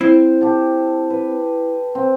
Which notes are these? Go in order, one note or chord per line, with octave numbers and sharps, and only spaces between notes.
C4 E4
G4 A4
B4
C4